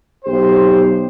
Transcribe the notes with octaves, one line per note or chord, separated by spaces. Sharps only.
B1 G4 C5